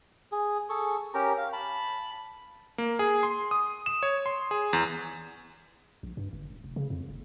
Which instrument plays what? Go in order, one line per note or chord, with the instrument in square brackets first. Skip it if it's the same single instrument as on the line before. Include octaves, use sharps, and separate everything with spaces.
[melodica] G#4
G#4 A4 C#6
C#4 G4 A#4 A#5
F5
A5 B5
[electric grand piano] A#3
G#4
C6
D#6
E7
C#5
C6
G#4
E2
[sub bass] A#1
G2
G1
D#1
F1
C#3
F2
F#1